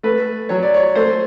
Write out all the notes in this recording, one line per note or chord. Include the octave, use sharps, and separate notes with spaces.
A3 B4
F#3 C#5
D5
C#5
A3 C5